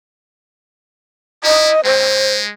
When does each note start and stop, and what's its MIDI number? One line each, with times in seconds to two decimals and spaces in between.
1.44 1.72 64
1.44 1.81 75
1.84 2.51 56
1.84 2.36 72